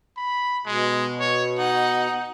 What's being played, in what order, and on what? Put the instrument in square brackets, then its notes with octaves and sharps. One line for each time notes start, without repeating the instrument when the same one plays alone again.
[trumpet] B5
[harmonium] B2 [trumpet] G#3
[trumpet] C#5
[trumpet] D#4 [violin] F#5